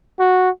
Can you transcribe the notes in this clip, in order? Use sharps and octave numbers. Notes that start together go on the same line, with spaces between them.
F#4